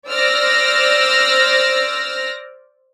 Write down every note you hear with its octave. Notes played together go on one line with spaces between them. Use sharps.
C5 D5 E6 F6 A#6